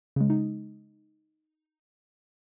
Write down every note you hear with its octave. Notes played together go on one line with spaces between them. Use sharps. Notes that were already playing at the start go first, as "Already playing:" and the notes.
C#3 G#3
D#4